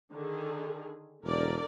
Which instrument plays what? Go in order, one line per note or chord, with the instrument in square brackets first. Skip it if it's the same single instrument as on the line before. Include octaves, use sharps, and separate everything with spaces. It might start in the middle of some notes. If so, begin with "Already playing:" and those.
[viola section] D3 D#3 G#4
[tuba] E1 [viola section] D3 A#4 D5